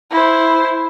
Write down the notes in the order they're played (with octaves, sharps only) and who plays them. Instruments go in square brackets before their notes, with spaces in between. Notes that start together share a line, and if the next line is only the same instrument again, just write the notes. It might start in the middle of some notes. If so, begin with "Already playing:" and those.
[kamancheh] E4 C5